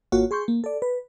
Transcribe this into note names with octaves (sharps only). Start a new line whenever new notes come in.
G#1 A#3 F4 F#4 C#5
G#4 C6 C#6 G6
A#3
A4 D5
B4